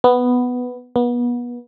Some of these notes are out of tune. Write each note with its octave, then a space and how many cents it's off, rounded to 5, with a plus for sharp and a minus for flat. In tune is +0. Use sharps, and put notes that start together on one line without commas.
B3 +5
B3 -30